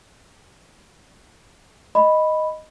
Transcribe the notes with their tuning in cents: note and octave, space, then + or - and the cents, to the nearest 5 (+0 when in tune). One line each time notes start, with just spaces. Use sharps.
D#5 +0 B5 +0